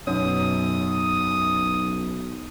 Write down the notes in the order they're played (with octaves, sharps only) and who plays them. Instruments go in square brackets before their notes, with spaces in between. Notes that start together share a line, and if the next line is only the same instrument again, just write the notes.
[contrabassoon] B1 [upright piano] F#2 B2 [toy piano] C#5 [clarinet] D#6